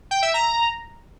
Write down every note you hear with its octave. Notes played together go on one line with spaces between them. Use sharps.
G5
E5
A#5